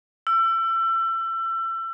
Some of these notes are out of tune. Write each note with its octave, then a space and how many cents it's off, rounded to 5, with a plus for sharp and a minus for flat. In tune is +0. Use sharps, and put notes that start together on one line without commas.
E6 +30